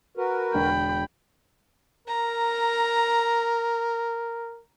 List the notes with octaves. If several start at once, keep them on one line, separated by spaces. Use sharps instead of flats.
F#4 A#4 B4
E1 D3 G5 B5
A#4 A#5